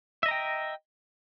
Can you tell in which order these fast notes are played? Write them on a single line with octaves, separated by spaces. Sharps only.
E5 D#5 A#5 G5